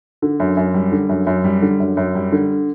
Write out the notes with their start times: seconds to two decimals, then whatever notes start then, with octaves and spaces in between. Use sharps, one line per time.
0.22 D3
0.40 F#2
0.57 F#2
0.74 G3
0.92 D3
1.09 F#2
1.27 F#2
1.44 G3
1.62 D3
1.80 F#2
1.97 F#2
2.15 G3
2.32 D3